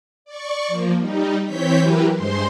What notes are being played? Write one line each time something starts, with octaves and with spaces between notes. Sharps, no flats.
D5 C#6
F3 A#3
G3 D#4
E3 C4 C#5 G6 B6
E3 F#3 G4 A#4 B4
G2 G#3 C5 C6